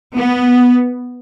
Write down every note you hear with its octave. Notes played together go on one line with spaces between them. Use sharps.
B3